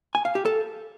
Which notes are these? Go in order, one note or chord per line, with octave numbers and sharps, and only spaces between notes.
G#5
F5
G4
A4